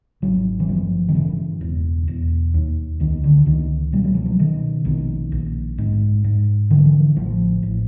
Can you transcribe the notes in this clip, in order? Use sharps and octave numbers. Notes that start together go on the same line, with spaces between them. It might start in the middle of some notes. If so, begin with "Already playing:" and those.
G#1 F#3
E3
G2 F3
D#3
C#3 E3
E1
E1
D#2
C#2 D#3
D3
C#2 D#3
B2 G3
F#3
F3
F#3
B2 D#3
A#1 D#3
A#1
G#2
G#2
D3 E3
F3
E3
A1 F3
A1